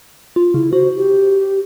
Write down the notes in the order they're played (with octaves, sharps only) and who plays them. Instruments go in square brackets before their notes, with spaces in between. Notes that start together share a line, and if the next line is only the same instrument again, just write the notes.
[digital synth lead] F4
[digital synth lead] C#3 [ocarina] E4
[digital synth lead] F#4 [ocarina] C5
[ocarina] G4